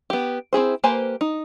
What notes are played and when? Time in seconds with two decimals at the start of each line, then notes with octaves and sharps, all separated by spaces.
0.10 B3 G4
0.53 C4 E4 G#4 C5
0.84 A#3 G4 B4 C5 G#5
1.21 D#4